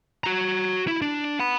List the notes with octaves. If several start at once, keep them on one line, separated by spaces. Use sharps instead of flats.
F#4 A#5
E4
D4
F#5 B5